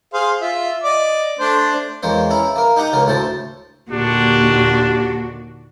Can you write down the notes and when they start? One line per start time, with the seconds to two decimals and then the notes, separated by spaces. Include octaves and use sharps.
0.14 G#4 C5 F5
0.41 F4 E5
0.84 D5 D#5 D6
1.39 A3 D4 C5
2.03 E2 G#3 A#3 C5 C#5
2.30 C#4 E4 A#5
2.56 A#3 A#4
2.76 D#4 G4 F#5 A#5 D#6
2.93 C#2 C#3 F#4 A#4
3.06 D2 A2 A3 C5 A5
3.91 D#2 A#2 D3 D4 F#4 G4